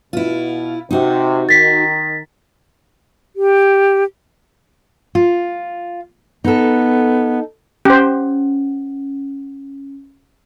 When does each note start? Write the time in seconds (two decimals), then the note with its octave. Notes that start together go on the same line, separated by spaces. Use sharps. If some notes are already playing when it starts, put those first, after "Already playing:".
0.13 B2 E4 F4
0.91 C3 D#4 F#4
1.49 D#3 A6 B6
3.36 G4
5.15 F4
6.44 B3 D#4 A4
7.85 C#4 G4 C5